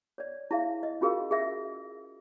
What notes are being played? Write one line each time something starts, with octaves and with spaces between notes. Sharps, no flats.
C#5 D5
E4 G#4 E5 F5
D#5
C#4 F4 F#4 G#4 A#4 F5
G#4 E5 E6